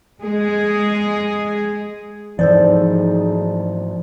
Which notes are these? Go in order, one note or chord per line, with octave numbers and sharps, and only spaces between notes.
G#3 G#4
G#2 E3 F3 D#4 G#4 A4 C5 D5